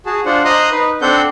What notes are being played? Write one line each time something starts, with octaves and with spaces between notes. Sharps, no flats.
F#4 G#4 A5
D4 F4 C5 F#5
C5 D#5 A#5 C6 D#6 F#6
D#4 B4
C4 D4 A4 C5 F#5 G6